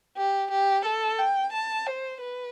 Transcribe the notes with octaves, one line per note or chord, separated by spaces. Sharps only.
G4
G4
A4
G5
A5
C5
B4